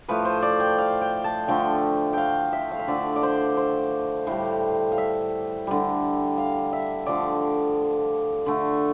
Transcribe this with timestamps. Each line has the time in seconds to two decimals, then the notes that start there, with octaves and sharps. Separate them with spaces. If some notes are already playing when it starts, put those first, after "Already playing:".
0.08 A2 F3 A3 B4
0.25 C5
0.42 D5
0.60 G5
0.78 F5
1.01 G5
1.24 A5
1.48 D3 F3 A3 G5
2.13 F5 G5
2.53 E5
2.71 F5
2.79 E5
2.87 D3 F3 A3 D5
3.16 D5
3.23 C5
3.57 C5
4.27 A2 G3
4.92 F5
4.98 E5
5.67 D3 G3
6.38 F5
6.73 E5
7.06 D3 F3 A3 D5
8.46 D3 A3